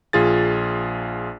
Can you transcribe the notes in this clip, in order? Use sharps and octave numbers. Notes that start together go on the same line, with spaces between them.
A#1 F4 G#4 A6